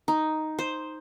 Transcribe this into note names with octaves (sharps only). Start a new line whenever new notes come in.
D#4
C5